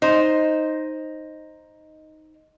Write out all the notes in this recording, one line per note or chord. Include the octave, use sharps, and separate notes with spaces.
D#4 C5